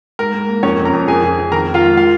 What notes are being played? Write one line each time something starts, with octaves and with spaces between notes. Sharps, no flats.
G#2 A#4
G#2
A#3
F2 C#4 C#5
F2
A#4 A#5
F2
F2 G#4 G#5
F2
F2
D#3 A#4 A#5
D#3
F4 F5
G#3
F4 F5